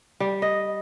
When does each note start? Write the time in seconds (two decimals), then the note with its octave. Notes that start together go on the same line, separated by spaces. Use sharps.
0.20 G3
0.42 D#5